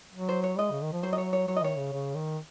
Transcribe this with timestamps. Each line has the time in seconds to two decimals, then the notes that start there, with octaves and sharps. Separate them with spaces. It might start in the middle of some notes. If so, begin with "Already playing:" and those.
0.14 F#3
0.29 C5
0.44 C#5
0.58 G#3 D#5
0.71 C#3
0.83 D#3
0.92 F3
1.03 F#3 C5
1.13 D#5
1.18 C#5
1.33 C#5
1.48 F#3 C#5
1.56 D#5
1.63 D#3 C#5
1.77 C#3
1.93 C#3
2.14 D#3